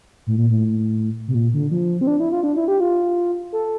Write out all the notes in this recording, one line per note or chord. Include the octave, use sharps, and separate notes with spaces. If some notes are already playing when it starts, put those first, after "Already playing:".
A2
A#2
A2
C3
A#2
D3
F3
C4
D4
E4
F4
D4
E4
G4
F4
A4